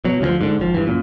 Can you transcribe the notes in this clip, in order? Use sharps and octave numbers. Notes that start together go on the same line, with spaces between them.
B2 F#3
D2 D3 F3
G#2 D3
G#1 F3
G2 E3
F#2 A#2